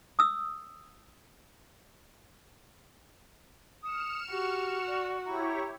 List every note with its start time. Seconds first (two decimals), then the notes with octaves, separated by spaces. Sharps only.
0.19 D#6 E6
3.83 D#6 F6 C#7 E7
4.31 F#4 G4
4.87 D5
5.25 E4 G4 C#5 A#5